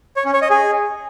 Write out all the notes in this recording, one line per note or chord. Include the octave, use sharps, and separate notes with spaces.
C#5
C#4
C#5
D#5
G#4